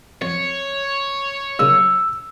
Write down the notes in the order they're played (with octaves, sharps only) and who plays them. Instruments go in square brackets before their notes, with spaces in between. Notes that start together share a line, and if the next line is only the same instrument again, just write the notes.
[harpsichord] F2 [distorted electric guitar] C#5
[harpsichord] F#2 A#2 C#3 [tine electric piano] E6